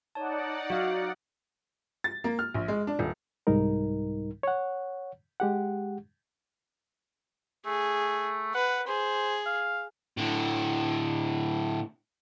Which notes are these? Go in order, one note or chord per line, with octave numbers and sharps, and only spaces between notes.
D#4 C#5 D5 F#5 A5
F#3 F#4 F5
A6
A#3
F6
A#1
G#3
D4
D#1
C2 G#2 G3 D#4 A#4
C#5 F#5
G#3 G4 F#5
A3 G#4
B4 F#5
G#4 C5
F5
A2 D3